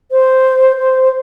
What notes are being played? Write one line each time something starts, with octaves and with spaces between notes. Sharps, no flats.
C5
C5